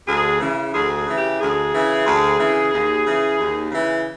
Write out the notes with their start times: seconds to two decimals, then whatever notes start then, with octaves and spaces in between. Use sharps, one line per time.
0.07 D2 G#4
0.40 C#3 E3
0.73 D2 G#4
0.95 G#4
1.07 C#3 E3
1.18 G4
1.40 D2 G#4
1.73 C#3 E3
2.05 D2
2.39 C#3 E3
2.72 D#2
3.05 C#3 E3
3.38 D#2
3.72 C#3 E3